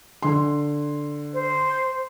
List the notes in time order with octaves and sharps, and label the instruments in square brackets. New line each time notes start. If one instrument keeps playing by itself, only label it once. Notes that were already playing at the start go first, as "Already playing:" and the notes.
[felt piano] D3 C6
[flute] C5